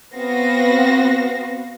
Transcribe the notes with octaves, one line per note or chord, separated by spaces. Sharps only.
B3 C4 F#4 F5 A#6